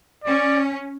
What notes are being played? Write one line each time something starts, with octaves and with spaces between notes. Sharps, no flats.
C#4 D5